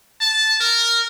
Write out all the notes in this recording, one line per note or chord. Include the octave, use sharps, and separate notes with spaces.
A5
A#4